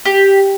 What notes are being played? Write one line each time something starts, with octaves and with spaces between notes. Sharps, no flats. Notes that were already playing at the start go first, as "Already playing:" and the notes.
G4